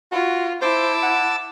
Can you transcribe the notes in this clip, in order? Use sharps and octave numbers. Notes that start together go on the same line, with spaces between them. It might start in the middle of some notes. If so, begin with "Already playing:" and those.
F4 F#4
E4 C5 A5 D6 E6
F#5